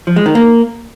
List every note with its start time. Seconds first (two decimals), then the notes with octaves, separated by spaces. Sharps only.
0.07 F3
0.16 G#3
0.26 D#3
0.35 A#3